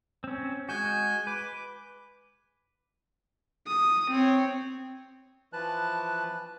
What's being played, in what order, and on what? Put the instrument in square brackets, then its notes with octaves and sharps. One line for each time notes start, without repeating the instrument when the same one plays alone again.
[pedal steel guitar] C4 C#4
[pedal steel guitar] G#3 F#4 [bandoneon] G#5 G6
[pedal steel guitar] B4 [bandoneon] D6
[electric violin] D#6
C4 C#5
[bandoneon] E3 F3 B4 A5 F#6